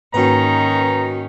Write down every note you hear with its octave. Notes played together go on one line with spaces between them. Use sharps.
G#2 D#3 A#3 C#4 D#4 F#4 B4 A#5